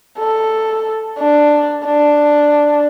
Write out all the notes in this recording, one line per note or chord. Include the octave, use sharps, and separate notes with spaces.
A4
D4
D4